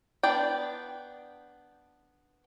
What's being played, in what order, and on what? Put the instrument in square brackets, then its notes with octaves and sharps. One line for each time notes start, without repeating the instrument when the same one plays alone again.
[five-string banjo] B3 D4 D5 G5